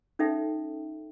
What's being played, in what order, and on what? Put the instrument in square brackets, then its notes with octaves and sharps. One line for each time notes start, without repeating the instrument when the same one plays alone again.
[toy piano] C#4 D#4 A4 E5 G5